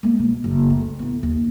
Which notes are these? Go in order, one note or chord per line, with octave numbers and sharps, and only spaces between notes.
G#3 A#3
B2
F#1
A3
A2 B3
D#2